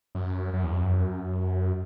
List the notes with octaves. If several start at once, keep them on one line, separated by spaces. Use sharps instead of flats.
F#2
F#2
E2
F2
F#2